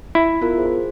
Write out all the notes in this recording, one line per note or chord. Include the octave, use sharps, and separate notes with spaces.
E4 E5
B3 F4 A#4
G#4 C5